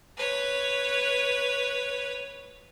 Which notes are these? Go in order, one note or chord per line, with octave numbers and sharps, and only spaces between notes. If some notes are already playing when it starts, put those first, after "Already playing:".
B4 C#5